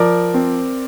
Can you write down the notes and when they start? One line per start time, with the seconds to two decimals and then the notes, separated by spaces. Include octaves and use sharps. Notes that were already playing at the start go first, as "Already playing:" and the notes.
Already playing: F3 A#4 D5
0.34 C4